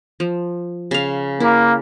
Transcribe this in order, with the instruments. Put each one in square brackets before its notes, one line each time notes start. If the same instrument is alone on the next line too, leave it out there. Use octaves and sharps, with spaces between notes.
[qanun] F3
C#3 F5
[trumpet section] A#3 [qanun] E4